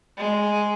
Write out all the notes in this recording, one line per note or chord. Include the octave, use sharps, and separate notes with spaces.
G#3